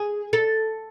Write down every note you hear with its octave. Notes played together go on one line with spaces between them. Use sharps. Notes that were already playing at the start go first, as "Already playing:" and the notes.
Already playing: G#4
A4